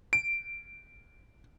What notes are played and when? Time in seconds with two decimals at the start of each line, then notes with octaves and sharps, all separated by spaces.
0.13 D7